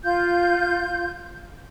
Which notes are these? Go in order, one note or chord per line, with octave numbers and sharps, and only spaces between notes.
F4 G6